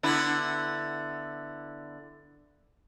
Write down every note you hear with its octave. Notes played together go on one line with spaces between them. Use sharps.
D3 B3 E4